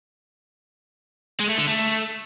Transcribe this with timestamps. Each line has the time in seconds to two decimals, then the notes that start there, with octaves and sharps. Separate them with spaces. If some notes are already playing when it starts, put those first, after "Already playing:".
1.40 G#3
1.49 A3
1.58 D3
1.67 A3